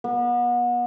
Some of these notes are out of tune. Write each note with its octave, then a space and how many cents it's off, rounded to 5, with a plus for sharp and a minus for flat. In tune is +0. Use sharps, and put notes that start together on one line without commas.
B3 -35